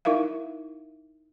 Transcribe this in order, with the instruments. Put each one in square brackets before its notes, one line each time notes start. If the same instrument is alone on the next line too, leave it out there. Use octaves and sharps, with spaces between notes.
[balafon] D#4 E4 A#4 E5 F5